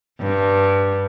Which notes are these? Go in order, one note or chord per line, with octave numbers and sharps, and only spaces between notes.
G2